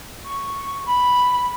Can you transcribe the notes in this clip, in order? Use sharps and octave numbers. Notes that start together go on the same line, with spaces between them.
C#6
B5